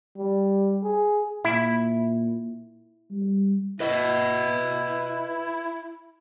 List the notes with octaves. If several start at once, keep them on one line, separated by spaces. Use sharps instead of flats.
G3
G#4
A#2 E4
G3
E4 B4 D#5